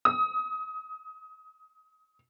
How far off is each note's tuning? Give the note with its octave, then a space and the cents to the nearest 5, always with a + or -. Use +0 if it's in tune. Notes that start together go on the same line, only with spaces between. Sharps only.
D#6 +25